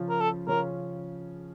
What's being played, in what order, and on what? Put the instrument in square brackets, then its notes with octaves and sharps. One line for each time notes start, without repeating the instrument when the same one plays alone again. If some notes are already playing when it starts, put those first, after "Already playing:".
Already playing: [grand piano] C#3 F3 C#4 F4
[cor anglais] A#4
A4
[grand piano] C#3 F3 C#4 F4 [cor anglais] A#4